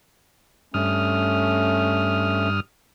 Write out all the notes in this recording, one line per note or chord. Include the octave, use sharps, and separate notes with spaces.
G2 A3 C#4 D#6 F6